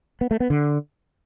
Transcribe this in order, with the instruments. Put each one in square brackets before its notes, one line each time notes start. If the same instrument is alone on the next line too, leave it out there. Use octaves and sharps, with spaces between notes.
[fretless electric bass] B3
A3
B3
D3